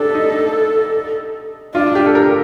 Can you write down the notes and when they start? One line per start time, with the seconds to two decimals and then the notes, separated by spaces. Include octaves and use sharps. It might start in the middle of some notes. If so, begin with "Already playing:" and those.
Already playing: D4 G4 A4
0.14 D#4
1.74 D4 F4
1.95 G4
2.06 A4
2.15 A#4